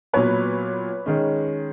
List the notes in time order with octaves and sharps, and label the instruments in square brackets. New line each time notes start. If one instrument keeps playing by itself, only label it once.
[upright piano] A#2 F#3 B3 [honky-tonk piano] B4 C#5
[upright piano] D#3 G#3 C#4